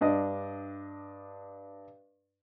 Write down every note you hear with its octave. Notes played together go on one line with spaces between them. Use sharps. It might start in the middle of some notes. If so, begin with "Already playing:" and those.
G2 D4 D#5